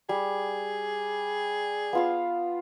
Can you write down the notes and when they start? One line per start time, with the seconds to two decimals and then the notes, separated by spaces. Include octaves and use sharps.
0.09 G3 G#4
1.93 B3 F4 F5